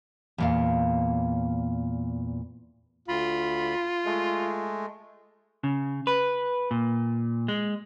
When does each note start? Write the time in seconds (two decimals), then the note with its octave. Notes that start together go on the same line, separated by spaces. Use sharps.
0.38 E2 A#2 F5
3.08 D2 F4 B5
4.05 G#3 A3
5.64 C#3
6.07 B4
6.71 A#2
7.48 G#3